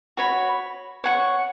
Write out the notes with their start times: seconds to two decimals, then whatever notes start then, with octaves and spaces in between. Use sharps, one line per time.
0.17 F#4 C#5 B5
1.04 C#5 F#5 C#6